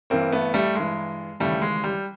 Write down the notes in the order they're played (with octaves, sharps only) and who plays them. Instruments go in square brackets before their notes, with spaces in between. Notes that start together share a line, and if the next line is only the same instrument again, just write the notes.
[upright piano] G2 E3 A#3 C4
A3 B3
G3 A3
G2 E3 G#3
D#2 C#3 E3 G3 A3
G#3
G3